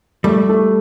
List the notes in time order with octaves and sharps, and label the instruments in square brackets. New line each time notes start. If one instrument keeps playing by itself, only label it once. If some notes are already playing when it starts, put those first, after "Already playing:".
[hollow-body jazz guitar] G3 [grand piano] A3
[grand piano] A3